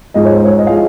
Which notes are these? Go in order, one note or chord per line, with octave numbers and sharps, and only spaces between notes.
G#2 F3 G#3 D#5
C#5
C5
C#5
D#5
F3 G#3 F5